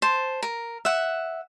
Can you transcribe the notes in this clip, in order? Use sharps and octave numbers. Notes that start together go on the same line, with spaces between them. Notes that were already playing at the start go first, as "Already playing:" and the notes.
C5 A5
A#4
E5 F#5